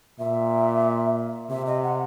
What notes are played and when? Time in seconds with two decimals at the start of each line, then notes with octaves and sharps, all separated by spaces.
0.19 A#2 E5
1.50 C3 E5
1.67 D#5
1.83 F#5